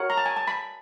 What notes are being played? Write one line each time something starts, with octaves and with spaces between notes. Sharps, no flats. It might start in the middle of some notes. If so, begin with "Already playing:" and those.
Already playing: F#4 A#4 C#5 F#5
A#5
A5
G#5
A5
B5